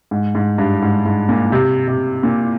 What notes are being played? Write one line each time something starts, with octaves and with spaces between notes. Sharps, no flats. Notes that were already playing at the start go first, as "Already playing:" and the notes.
G#2
G#2
G2
G#2
G#2
A#2
C3
C3
A#2